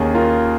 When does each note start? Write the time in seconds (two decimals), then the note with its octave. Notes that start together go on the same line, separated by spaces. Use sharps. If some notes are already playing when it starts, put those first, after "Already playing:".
Already playing: D#2 D#3 A#3 C#4 G#4 C#5
0.15 F4 A#4